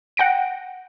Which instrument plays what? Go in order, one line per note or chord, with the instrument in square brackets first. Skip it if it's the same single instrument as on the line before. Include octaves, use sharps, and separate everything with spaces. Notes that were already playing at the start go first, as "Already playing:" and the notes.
[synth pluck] F#5 G5 A#6 D7